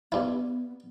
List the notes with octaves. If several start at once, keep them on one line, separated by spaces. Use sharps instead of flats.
G2 B3 E4